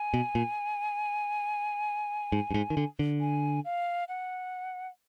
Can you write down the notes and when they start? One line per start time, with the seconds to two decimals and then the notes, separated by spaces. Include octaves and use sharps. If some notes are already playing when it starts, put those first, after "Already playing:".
Already playing: G#5
0.14 B2
0.35 A#2
2.32 G#2
2.51 G2
2.54 G#2
2.70 D#3
2.77 D3
2.99 D3
3.21 G#5
3.65 F5
4.08 F#5